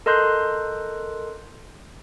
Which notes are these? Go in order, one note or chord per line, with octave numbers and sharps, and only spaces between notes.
A4 A#4 D#5 C6 F#6 G6